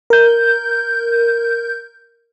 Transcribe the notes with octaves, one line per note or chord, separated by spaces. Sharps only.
A#4 G6